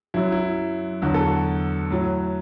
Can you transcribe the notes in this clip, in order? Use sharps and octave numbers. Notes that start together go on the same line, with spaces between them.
F#2 F#3 E4
E4
E2 D3 F#3 F#4
A4
F#4
A2 F#3